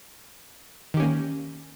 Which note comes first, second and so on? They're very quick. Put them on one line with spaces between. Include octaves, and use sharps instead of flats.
D#3 G4 C#4 A#3